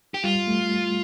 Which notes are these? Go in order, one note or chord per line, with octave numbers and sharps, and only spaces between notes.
G4
G3 F4
A3